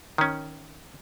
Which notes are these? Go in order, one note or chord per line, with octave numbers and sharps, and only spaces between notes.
D#3 C#4